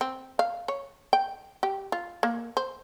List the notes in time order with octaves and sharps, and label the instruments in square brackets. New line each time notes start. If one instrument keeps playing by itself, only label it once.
[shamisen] C4
F5
C#5
G5
G4
F4
A#3
C5